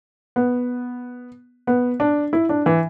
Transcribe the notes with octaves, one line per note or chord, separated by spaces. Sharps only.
B3
B3
D4
E4
D4
E3